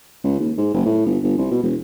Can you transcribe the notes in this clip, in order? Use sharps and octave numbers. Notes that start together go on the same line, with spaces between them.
C#2
D#2
G#2
F#1
A2
G1
G1
C2
B2
E1